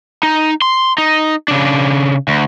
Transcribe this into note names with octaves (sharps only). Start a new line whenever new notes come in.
D#4
C6
D#4
C#3 D4
D2